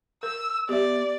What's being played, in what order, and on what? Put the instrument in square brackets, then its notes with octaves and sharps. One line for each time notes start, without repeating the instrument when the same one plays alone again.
[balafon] A#4 [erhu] E6
[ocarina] B3 [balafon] G4 E5 [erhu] D5